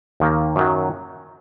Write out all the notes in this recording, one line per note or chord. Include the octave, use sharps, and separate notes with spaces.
D#2 D#3 A#3
F#2 D#3 F#3